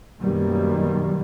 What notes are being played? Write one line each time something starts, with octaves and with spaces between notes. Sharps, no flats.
F#2 B2 D#3 G3 A#3